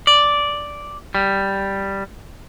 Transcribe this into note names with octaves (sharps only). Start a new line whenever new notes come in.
D5
G3